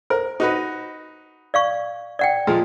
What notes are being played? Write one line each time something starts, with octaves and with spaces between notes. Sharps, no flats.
A#4 C5
D#4 F#4 B4
D5 F5 C#6
D5 F#5 G5
A#2 F3 G#3